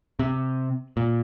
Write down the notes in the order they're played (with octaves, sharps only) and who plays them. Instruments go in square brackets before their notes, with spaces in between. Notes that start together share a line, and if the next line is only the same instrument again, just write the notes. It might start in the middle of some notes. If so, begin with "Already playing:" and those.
[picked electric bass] C3
A#2